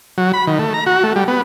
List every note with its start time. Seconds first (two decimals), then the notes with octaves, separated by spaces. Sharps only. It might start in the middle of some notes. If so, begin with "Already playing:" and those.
0.18 F#3
0.34 B5
0.47 D#3
0.59 A3
0.74 A#5
0.86 F#4
1.03 A3
1.16 G3
1.28 B3